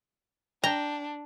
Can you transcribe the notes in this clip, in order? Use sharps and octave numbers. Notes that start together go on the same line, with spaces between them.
D4 G5 A#5